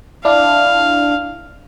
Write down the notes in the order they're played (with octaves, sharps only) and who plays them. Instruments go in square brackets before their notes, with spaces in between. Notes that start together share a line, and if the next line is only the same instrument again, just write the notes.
[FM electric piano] D4 E4 [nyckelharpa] F5